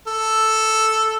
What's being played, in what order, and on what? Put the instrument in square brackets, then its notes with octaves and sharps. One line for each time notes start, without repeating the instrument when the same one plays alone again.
[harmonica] A4